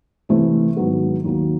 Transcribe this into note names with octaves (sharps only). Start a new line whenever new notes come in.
C3 E3 A3 C4
G#2 D#3 F#3 B3
D#2 D#3 F#3 A#3